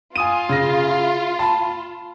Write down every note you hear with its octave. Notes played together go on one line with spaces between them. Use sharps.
F4 G#5 D#6 D#7
C#3 A#6
A5 B5